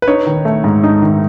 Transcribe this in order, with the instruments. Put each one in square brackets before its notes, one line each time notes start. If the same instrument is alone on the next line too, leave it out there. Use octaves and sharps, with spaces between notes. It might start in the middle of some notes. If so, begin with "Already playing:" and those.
[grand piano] B4
D#4 C#5
D#3
A3
G#2
D#4
D#3